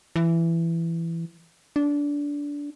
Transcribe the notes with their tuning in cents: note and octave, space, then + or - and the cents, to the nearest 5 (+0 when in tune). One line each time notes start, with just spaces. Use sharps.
E3 +15
D4 -20